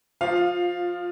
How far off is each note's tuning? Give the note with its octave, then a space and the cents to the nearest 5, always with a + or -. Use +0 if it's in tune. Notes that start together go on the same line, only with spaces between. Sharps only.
F3 +0 F4 +20 F5 +5